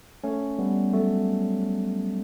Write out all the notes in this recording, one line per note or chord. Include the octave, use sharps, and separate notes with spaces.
A3 C#4
G3 B3
F#3 A3